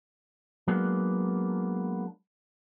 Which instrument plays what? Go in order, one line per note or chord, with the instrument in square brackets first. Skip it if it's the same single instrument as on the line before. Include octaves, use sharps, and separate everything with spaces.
[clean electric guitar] F#3 G#3 A#3 B3 D4